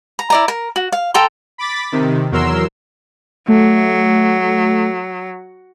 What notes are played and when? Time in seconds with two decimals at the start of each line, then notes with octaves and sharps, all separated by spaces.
0.19 A#5
0.30 E4 D5 A#5
0.48 A#4
0.76 F#4
0.92 F5
1.14 A4 G5 A#5 C6
1.58 B5 D6 A6 B6
1.92 C3 D#3
2.32 E2 F#3 A#4 C6 E6
3.48 F#3 A3